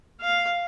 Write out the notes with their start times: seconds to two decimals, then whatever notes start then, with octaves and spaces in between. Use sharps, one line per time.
0.20 F5